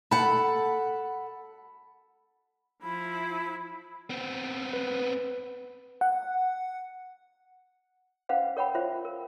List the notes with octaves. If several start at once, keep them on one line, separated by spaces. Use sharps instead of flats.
A4 F#5 B5
F3 E4 B5
B3 C4
B4
F#5
C#4 B4 C5 F5 F#5
A#4 C#5 F#5 G5 B5
F4 C5 E5
A#4